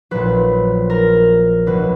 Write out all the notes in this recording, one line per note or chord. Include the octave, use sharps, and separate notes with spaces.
A#1 A#2 F#3 B4
A#4
C#2 B2 F#3 B4